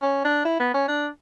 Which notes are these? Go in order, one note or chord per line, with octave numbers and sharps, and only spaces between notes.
C#4
D4
E4
B3
C#4
D4